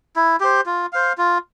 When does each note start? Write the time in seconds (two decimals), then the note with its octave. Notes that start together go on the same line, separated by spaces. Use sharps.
0.16 E4
0.40 G4 C5
0.66 F4
0.93 C5 F5
1.18 F4